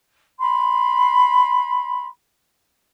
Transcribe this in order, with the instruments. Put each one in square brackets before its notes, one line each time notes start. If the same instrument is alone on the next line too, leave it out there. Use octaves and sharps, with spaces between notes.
[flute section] B5 C6